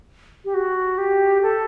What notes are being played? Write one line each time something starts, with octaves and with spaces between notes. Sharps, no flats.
G4
F#4
G4
A4